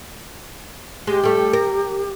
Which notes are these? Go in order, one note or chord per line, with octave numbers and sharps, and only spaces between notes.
G#3 G4
G3 A3
A#4